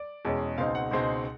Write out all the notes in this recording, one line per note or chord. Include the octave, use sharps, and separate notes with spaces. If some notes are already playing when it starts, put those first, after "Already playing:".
Already playing: D5
E2 B2 G#3 C#4
C#2 B2 G#3 C4 D#4 F5
F#5
C#2 B2 G#3 C4 D#4